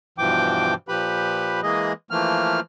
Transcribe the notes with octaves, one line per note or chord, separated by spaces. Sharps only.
G2 B2 E3 F3 G5 D6
A#2 F3 G4 B4 B5
E3 G#3 A#3 G#4 D#5
E3 F3 A3 A#3 F6